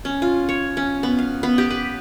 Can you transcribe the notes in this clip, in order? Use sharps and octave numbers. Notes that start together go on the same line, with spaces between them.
C#4
F4
C#5
C#4
B3
F5
B3
G4
B4